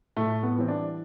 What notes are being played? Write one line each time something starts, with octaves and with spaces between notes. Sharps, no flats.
A2 A3
B3
E3 G3 C4
D4